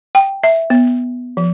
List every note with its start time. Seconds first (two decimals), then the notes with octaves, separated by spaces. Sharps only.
0.15 G5
0.44 E5
0.70 B3
1.37 F3